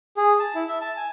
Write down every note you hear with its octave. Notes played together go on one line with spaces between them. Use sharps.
G#4
A5
E4
E5
A5
G#5